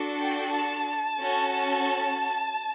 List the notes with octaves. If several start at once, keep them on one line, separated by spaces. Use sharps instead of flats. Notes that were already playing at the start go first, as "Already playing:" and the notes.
Already playing: D4 F#4 A4
G5
A5
C#4 F#4 A4